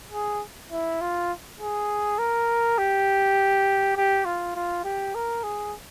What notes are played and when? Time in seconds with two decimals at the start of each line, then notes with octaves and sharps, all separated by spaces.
0.12 G#4
0.72 E4
1.01 F4
1.60 G#4
2.18 A#4
2.78 G4
3.97 G4
4.25 F4
4.55 F4
4.84 G4
5.15 A#4
5.43 G#4